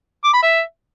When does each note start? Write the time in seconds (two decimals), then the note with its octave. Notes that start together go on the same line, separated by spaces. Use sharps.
0.24 D6
0.33 B5
0.43 E5